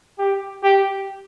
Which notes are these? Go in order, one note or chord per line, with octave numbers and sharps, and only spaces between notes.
G4
G4